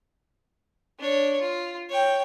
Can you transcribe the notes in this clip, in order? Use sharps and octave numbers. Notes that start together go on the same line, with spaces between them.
D4 C#5
F4
C#5 G5